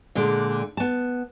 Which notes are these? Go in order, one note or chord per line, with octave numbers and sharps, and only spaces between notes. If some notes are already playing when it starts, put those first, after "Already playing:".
A#2 D3 G#3
B3 A5